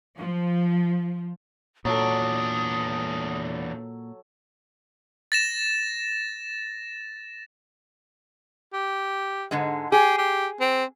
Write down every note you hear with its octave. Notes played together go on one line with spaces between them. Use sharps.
F3
E2 A#2 F#3 D4 A4 D#6
A6 A#6 E7
G4
G#2 D3 G#3
G4 G#4
G4
C4